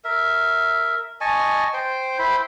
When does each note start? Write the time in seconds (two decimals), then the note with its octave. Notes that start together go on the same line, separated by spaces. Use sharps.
0.04 A#4 E5
1.21 D#5 G#5 A5 C#6
1.74 C5 G5
2.19 E4 C5 G5 B5